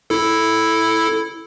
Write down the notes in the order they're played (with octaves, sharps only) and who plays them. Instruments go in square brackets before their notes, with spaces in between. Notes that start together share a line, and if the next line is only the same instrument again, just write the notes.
[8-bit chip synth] E4 A4